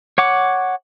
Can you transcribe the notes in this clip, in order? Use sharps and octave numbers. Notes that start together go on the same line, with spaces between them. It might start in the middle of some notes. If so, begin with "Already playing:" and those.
C#5 F#5 D6